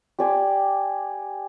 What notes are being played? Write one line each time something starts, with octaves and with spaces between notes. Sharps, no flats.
G4 D5 G#5 C6